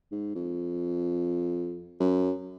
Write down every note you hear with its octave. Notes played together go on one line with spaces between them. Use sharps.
G#2
F2
F#2